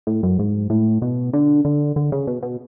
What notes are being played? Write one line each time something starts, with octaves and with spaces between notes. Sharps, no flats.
A2
F#2
G#2
A2
B2
D3
D3
D3
C#3
B2
B2